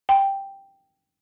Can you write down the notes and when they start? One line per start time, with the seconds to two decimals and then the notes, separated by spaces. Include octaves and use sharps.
0.09 G5